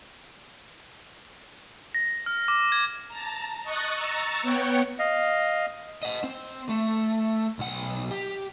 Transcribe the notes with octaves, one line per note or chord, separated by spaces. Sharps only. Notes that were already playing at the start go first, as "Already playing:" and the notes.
A#6
F6
D6
G#6
A5 A#5
D#5 C#6 D#6 F#6 A6
A#5 C#6 E6 A6
B3 C#5 F#5 G5
D#5 F5
D#5 F#5
C4
A3
B1 F#5
G4